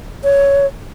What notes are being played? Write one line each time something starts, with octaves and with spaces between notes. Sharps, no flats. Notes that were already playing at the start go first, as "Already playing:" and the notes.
C#5